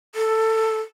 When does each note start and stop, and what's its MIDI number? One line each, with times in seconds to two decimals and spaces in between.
0.15 0.80 69